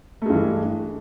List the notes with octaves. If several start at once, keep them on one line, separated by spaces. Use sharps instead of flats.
G2 E3 G#3 A3